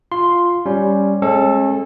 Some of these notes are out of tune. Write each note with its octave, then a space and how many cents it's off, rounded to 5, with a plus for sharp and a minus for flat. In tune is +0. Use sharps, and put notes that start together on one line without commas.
F4 +0 C6 +0
G3 +0 C#4 +0
G#3 +10 C#4 -40 A4 +0